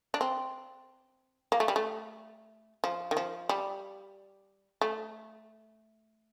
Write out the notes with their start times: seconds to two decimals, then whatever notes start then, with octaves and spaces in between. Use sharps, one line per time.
0.14 D4
0.21 C4
1.52 A#3
1.60 A3
1.68 G3
1.76 A3
2.84 F3
3.11 D#3
3.17 F3
3.49 G3
4.81 A3